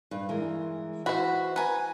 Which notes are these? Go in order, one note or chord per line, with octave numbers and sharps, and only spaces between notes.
G2
E3 G#3 A#4
E3 F#4 C5 B5
B4 G#5 A#5